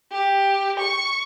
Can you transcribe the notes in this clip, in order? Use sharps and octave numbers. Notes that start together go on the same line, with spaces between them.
G4
C#6